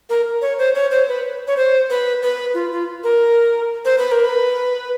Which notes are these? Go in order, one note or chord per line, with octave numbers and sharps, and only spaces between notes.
A#4
C#5
C5
C#5
C5
B4
C#5
C5
B4
B4
F4
F4
A#4
C5
B4
A#4
B4